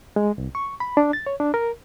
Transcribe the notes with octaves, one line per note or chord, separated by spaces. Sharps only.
G#3
C2
C#6
B5
D4
A6
C#5
D4
A#4